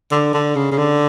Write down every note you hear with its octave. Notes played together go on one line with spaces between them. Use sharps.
D3
D3
C#3
C#3
D3